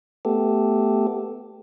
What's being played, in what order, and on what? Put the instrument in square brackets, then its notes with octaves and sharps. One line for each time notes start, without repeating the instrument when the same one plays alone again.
[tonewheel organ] A3 B3 G4 A4